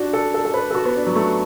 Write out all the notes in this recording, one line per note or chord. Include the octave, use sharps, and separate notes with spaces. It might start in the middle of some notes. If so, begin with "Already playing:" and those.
Already playing: D4 F#4
A4
A4
A4
B4
A4
F#4
B3
D4
F#3
A3